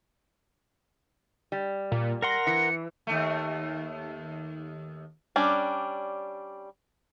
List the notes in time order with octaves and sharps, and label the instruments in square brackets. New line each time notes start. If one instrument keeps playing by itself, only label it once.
[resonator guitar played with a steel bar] G3
[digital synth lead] A#2
[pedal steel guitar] A#4 F#5 C6 [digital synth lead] A#6
[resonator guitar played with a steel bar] E3 [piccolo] C#7
[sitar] D#2 A3
[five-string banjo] G3 C#4 D4